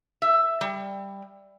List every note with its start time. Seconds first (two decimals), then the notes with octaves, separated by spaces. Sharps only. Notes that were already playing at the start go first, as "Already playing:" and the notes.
0.22 E5
0.61 G3